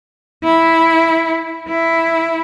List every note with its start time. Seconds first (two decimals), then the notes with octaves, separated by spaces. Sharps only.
0.43 E4
1.68 E4